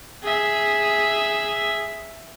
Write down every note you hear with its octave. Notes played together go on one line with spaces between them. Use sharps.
G#4 E5